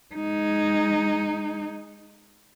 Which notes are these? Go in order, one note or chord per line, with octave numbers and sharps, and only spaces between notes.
G#3 D#4